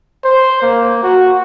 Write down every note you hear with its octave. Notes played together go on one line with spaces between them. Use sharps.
C5
A#3
F#4